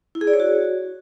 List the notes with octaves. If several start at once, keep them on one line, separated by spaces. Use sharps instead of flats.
E4
G#4
D5
C#5
F#4